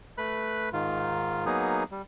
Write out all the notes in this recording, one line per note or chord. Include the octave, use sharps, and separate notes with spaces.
A3 B4 B5 F#6
G#2 D#3 F4
F#3 A#3 B3 D#4 G#4
G3